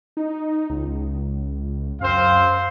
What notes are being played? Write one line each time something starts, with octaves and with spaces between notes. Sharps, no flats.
D#4
C#2
F#2 C4 C5 F5